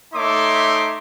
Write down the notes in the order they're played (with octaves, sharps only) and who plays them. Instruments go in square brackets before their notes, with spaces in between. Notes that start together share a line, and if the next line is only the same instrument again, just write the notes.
[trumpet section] A3 D#4 C#5 E5 C6 D6